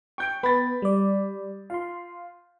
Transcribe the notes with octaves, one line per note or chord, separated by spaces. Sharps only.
G5 C#6 G6 D7
B3 B5 A6
G3 D5
F4 F5 C6